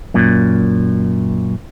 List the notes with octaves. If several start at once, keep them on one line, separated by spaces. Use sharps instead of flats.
F#2 A#2